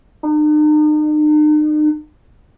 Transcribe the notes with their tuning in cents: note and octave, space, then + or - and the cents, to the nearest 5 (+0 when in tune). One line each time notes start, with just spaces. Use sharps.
D#4 -45